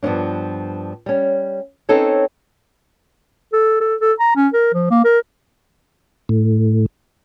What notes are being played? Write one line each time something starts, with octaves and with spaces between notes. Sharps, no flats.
G2 F3 B3 C#4 D4
G3 C#4
C4 C#4 D#4 A4 B4 C#5
A4
A4
A4
A#5
C#4
A#4
F3
A#3
A#4
A2